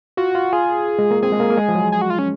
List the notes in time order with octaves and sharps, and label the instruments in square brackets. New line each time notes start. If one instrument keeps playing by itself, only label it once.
[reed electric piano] F4 [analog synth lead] F#4
[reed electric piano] F4
[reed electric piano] F4 [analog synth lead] G#4
[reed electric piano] G#3
A#3
[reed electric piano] C4 [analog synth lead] G#4
[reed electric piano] G#3
A#3
A#3
G#3
F3
F#3
[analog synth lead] G#4
F#4
F4
C#4